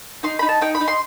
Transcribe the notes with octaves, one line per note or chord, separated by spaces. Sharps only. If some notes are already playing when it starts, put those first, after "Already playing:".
D#4 C6
D#4 B5
A5
D#4 G5
B5
D#4
C6